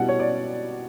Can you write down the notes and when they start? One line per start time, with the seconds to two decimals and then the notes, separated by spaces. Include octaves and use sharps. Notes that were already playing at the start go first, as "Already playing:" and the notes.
Already playing: B2 G3 E4 F#5
0.08 C#5
0.20 D5